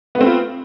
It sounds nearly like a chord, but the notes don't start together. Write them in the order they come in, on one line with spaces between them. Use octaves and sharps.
B3 A3 C4 B4 F4